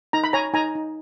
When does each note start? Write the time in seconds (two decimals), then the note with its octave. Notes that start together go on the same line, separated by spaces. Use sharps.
0.13 D#4 A#5
0.24 B5
0.33 C#5 G#5 A#5
0.54 D#4 G#5 A#5
0.75 D#4